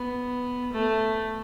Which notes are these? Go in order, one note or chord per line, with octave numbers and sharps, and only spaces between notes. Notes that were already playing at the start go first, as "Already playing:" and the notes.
Already playing: B3
A3